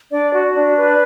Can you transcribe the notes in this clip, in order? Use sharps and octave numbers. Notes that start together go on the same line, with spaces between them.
D4 D5
F#4
D4
B4